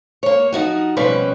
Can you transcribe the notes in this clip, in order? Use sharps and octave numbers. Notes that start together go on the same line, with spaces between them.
A#3 C#5
F3 D#4 F#4
B2 F3 G3 C#4 B4 D5